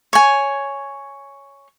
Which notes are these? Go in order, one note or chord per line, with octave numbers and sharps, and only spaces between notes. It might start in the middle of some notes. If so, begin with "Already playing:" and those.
C#5 G#5